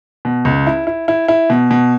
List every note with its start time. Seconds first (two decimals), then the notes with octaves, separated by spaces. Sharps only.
0.25 B2
0.45 C#2
0.67 E4
0.87 E4
1.08 E4
1.28 E4
1.50 B2
1.71 B2